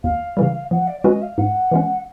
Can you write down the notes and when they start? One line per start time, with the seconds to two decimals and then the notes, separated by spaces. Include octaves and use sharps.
0.03 D#2 F5
0.37 C#3 E3 G3
0.71 F3 F#5
0.87 D5
1.00 D5
1.04 G#3 C#4 F#4 B4 D#5
1.22 F5
1.38 G#2 F#5
1.72 E3 G#3 C#4